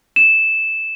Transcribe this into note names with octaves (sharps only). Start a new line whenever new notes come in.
E7